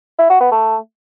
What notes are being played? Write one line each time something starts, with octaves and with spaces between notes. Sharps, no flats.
E4
F#4
B3
A3